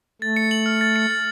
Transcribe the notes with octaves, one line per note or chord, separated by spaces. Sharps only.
A3 A6
C#7
F#7
F6
A6
C#7
A6